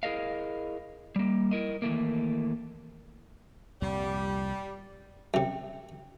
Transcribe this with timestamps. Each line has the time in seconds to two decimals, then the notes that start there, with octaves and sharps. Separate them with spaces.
0.03 E4 G#4 A#4 D#5 F5
1.16 G3 A#3
1.51 E4 A#4 D#5
1.82 D#3 E3 A3 A#3
3.82 C2 F2 A#2 G3
5.34 F#2 C3 E5 G5